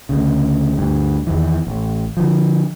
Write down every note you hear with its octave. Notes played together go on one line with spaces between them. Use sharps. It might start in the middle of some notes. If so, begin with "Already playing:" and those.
D2 C#3
D2 G2
E2 D#3 E3
A1
D3 F3